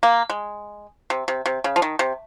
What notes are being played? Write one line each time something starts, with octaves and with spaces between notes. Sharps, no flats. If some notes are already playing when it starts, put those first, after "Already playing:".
A#3
G#3
C3
C3
C3
C#3
F3
D#3
C3